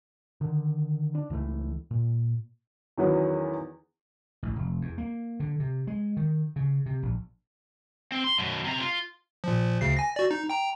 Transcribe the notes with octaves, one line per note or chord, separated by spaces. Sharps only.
D3 D#3
D4
C#2 E3 F3 A3
A#2
E2 D#3 E3 F#3 B3 C#4
A1
F1
E2
A#3
D3
C3
G#3
D#3
C#3
C3
A#1
C4
C6
F#2 B2
C3 A#5
F4
A#2 F3
D2 C#3 C7
G#5 A#6
F#4 D5
D#4
G5 A#5